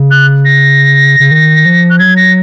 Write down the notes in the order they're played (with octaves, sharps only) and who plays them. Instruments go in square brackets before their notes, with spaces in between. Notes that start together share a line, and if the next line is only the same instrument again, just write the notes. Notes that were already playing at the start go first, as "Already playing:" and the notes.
Already playing: [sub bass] C#3
[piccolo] F#6
A#6
[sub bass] C#3
D#3
F3
[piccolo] F#6
[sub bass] F#3 [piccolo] G#6
[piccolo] A#6